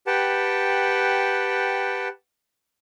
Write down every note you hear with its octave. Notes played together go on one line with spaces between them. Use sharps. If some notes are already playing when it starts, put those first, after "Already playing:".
G4 B4 F#5 G5 A5